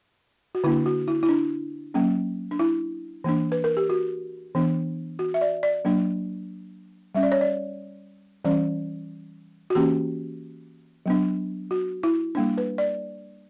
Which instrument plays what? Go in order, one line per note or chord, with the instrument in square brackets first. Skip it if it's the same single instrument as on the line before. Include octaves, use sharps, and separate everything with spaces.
[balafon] F#4
D3 A#3 D4 E4
F#4
E4
E4
D4
F#3 A#3 C#4
D4
E4
E3 A#3 D4
B4
A#4
G4
F#4
E3 B3 D4
F#4
E5
D5
D5
F#3 A#3 D4
G3 C#4 E5
D5
C#5
D5
E3 G3 C#4 D5
F#4
E3 A#3 C#4 G4
F#3 B3 D4
F#4
E4
G3 A#3 D4
B4
D5